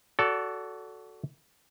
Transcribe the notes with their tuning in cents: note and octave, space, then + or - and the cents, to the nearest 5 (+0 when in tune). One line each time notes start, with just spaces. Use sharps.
F#4 +5 A4 +0 D5 -30